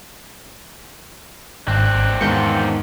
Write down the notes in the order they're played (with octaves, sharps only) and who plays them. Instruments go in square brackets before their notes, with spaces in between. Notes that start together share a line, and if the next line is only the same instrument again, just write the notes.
[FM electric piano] G#1 [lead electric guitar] C4 D4 [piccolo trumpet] F#6
[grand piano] E2 G#2 D#3 [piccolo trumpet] F4 [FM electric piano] G6 C#7